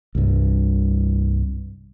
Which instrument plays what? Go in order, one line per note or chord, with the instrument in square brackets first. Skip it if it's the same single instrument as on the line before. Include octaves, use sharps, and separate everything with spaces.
[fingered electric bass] C2 G2